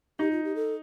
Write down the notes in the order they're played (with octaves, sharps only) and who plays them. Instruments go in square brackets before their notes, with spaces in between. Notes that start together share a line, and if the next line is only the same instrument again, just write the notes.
[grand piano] D#4 [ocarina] G4
[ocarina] F4
G4
A4